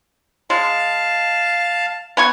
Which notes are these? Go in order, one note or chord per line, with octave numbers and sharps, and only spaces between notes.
G#3 F5 A5
B3 G#5 C#6